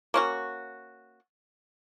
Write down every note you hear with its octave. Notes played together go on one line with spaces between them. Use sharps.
A#3 C#4 F#4